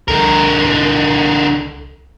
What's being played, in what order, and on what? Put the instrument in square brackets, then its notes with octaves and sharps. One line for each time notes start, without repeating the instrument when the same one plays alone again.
[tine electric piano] C2 A4 [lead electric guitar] D3 A#4